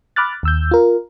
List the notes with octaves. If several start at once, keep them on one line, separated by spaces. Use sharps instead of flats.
B5 D6 F6 F#6 A6
D#2 E6 G6
F4 A#4